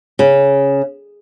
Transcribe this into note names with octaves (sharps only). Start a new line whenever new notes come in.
C#3